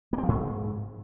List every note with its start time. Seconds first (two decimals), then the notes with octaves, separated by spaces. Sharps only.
0.13 A#3
0.18 C4
0.23 F3
0.28 G#2